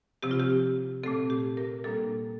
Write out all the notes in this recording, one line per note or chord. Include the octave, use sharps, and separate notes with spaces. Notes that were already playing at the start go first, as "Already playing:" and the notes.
C3 F3 C4 G4
F4
G4
A#2 A3 C4 A4
G4
A#4
A#2 G3 A#3 D4 A4